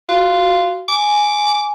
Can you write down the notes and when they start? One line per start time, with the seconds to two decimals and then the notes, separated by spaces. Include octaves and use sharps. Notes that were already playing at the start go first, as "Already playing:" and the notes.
0.09 F4 F#4
0.88 G#5 D6